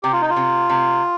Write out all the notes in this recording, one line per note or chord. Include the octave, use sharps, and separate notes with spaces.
C3 G4
F4
D#4
F4
C3
C3